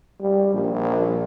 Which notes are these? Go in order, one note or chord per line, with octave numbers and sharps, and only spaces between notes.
G3
A#1